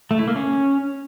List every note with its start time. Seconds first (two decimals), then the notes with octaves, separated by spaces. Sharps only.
0.11 A3
0.19 E4
0.28 A#3
0.36 C#4